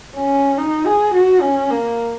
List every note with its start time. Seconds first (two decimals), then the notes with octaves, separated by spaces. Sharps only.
0.16 C#4
0.58 D#4
0.86 G#4
1.14 F#4
1.42 C#4
1.70 A#3